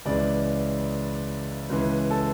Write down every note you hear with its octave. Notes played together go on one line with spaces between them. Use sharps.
C#2 C#3 E3 D5
C#2 C#3 E3
A4